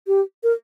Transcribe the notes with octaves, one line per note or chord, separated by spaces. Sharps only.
G4
A#4